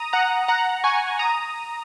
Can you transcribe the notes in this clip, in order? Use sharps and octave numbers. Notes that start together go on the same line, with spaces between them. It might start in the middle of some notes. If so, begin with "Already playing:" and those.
Already playing: A#5 D#6
F#5 A#5
F#5 A#5
G#5 C#6
A#5 D#6